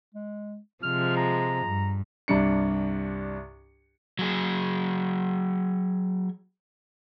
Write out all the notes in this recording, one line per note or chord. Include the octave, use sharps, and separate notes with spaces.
G#3
C3 F3 G#3 F6
A#5
G2
C2 G2 D4 C#7
F#3 G#4